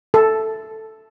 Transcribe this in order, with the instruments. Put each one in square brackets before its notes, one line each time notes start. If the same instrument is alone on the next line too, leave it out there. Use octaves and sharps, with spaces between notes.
[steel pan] A4